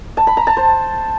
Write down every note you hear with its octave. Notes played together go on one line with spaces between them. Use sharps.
A5
B5
A#5
A5
C5